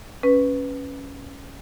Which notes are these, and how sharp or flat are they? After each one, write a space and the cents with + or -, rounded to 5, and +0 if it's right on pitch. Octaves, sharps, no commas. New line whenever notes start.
C#4 +0 B4 +0